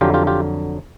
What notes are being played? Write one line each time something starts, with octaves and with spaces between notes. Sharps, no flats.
F2 D3 F#3 F4 G4
F4 G4
F4 G4